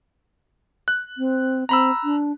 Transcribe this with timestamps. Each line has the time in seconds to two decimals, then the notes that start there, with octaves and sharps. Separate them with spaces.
0.88 F#6
1.18 C4
1.69 C4 A#5 B5 E6
2.04 D4